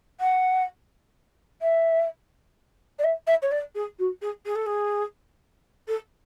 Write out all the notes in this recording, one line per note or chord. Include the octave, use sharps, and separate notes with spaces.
F#5
E5
D5
E5
E5
C#5
D5
G#4
F#4
G#4
G#4
A4
G#4
A4